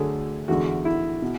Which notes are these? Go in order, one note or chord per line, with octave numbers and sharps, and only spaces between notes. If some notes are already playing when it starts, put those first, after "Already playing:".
Already playing: D2 D3 F#3 A3 D4 G#4
E2 D3 G#3 F#4
E4
B2